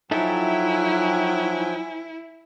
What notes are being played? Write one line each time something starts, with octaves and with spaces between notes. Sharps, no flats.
F3 F#3 D#4 E4 A4 E5 G5 G#5